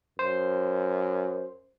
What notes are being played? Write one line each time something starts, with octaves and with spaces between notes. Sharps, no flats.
F#2 C5